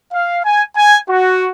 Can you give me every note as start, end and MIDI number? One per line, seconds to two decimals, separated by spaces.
0.12 0.39 77
0.44 0.63 80
0.76 0.99 80
1.08 1.50 66